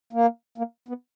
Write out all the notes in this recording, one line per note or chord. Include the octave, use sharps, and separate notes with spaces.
A#3
A#3
B3